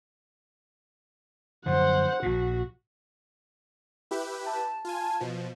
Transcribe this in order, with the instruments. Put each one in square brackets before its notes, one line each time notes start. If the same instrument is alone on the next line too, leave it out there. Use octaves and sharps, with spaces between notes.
[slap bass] F#2 D3 F3 [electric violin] C5 F#5
[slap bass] A#1 A#2 [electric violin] F#4
[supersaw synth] E4 G4 B4
[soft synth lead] A5
[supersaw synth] F4 G#5
B2 F3